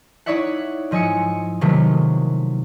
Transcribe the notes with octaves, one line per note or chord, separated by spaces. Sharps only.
D#4 E4 C#5 D5 E5 F#5
G#2 F3 D#5 G#5 E6 C#7
C3 D#3 F3 F#3 A3 A#3